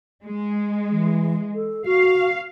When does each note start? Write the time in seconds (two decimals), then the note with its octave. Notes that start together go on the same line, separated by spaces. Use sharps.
0.23 G#3
0.92 E3
1.55 A4
1.86 F#4 F5